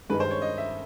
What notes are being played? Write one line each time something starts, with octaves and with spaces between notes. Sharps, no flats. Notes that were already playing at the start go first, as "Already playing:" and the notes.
G2 D#3 G#3 B4
C5
C#5
D#5
E5